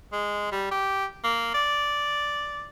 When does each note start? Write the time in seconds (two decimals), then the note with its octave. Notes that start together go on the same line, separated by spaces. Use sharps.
0.13 G#3
0.52 G3
0.71 G4
1.24 A#3
1.54 D5